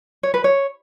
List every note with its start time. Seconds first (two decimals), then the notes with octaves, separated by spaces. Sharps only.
0.23 C#5
0.34 B4
0.44 C#5